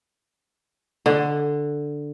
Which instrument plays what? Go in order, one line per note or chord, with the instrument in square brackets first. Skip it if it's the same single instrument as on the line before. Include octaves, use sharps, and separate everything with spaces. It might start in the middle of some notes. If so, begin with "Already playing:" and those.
[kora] D3